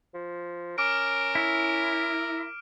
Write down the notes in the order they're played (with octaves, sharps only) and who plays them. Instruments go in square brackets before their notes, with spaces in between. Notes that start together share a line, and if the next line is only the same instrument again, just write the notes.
[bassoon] F3
[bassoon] C#4 [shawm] A#4 [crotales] D6 F6 D7
[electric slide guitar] E4